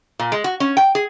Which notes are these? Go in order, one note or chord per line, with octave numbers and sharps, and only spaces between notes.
A#2
G#3
F#4
C#4
G5
G#4